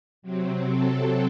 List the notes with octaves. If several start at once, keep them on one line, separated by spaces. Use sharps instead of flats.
C3 F#3 C4
A4